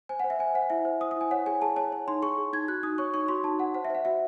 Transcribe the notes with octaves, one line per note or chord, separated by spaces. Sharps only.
C5 G#5
C5 F#5
E5
C5 G#5
C5 F#5
E4 E5
C5
C5 D#6
D#6
E4 G#5
C#5 F#5
G#4 G#5
G#4 A5
C#5 A5
C#5
D#4 C6
G#4 C#6
G#4
D#4 G#6
F#4 F#6
D#4 D#6
C#5 C#6
D#4 C#6
F#4 C6
D#4 A5
D#4 F#5
C5 F#5
E5
C5 F#5
F#4 E5